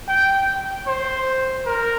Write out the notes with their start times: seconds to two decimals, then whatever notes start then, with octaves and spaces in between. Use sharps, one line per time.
0.08 G5
0.87 C5
1.66 A#4